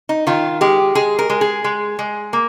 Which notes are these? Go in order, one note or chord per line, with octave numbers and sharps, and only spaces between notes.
D#4
D#3 F4
G#3 G4
G#3 G#4
A#4
G#3
G#4
G#3
G#3
A#3